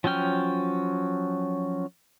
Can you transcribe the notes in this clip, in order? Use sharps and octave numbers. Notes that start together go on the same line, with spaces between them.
F3 F#3 C#4 G5 F6